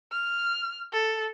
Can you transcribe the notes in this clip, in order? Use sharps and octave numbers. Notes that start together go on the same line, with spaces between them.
F6
A4